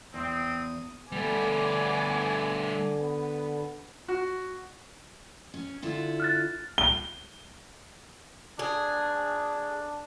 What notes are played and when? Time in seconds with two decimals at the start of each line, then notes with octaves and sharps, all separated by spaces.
0.14 E2 C4 D#6
1.12 D3 G3 A3 B3 G#5 D6
3.00 B3
4.08 F#4
5.54 C#4
5.82 D3 E4 F4
6.20 F6 F#6 A6
6.78 G7
8.59 D4 G#4